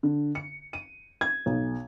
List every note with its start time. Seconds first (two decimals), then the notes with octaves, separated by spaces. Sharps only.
0.03 D3
0.35 C#7
0.73 D#7
1.21 G#6
1.46 B1